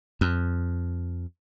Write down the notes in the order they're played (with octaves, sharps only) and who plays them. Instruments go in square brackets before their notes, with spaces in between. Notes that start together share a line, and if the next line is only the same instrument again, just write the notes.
[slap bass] F2